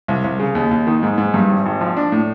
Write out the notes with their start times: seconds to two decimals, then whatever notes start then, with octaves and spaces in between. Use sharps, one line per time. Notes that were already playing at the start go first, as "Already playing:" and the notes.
0.08 C2
0.24 C2
0.39 C#3
0.55 D#2
0.71 D#2
0.87 D#3
1.03 G#2
1.18 G#2
1.34 G2
1.49 G#1
1.66 G#1
1.81 F3
1.97 D4
2.12 A2